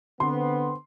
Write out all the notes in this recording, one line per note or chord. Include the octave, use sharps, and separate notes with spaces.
D3 B3 C4 C6